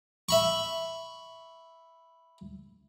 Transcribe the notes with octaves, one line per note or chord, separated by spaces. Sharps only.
E5 B5 C#6